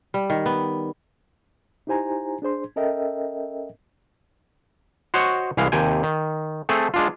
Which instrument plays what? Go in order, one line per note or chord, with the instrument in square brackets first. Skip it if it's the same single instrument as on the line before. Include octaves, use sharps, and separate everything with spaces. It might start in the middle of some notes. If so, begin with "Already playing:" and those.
[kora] G3
D#3
B3
[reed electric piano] D#4 E4 G4 C5 G#5 A#5
D4 G#4 C5 C6
C#4 A4 A#4 D#5 E5 G5
[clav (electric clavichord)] F#4 C5 C#5 D#5 F#5
C2 E3 G#3 F5
D#2 C3 G5 G#5
D#3
A3 C4 G#4 A4
G#3 D4 F4